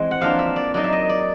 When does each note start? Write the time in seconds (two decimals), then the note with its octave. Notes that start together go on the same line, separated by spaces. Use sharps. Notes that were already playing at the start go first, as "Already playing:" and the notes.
Already playing: E3 G#3 C4
0.11 F#5
0.21 F3 A#3 D4 F4 F5
0.39 E5
0.56 D5
0.74 F#3 A#3 D#4 D5
0.84 E5
0.92 D#5
1.09 D5